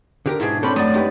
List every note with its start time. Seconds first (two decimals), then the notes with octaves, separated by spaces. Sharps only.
0.26 D3 G4 A#4
0.40 G#2 B2 D4 E4 G#4
0.63 C4 C#4 A4 C#5 D5 B5 G6
0.76 F#2 A3 F#4 D5 D#6
0.94 G#3 D#4 G4 B4